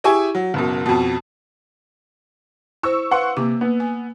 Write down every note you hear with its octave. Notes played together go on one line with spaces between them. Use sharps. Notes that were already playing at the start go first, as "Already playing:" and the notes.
E4 G4 G#4 E5 G#5 C#6
F#3
F#1 F#2 B2
F2 B2
E4 C5 C#6 E6
B4 F5 F#5 C6 C#6
C3 A#3 D6
A#3 B3
G#5